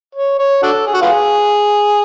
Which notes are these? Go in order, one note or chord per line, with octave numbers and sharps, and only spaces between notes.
C#5
C#5
D4 F#4 A4
G#4
F#4
B3 F4 G#4